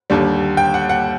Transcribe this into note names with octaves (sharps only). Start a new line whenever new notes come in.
D#2 D3 G3
G5
F#5
F#5